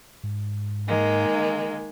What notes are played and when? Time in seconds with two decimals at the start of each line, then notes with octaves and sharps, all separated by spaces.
0.24 G#2
0.87 D#3 G#3 A#3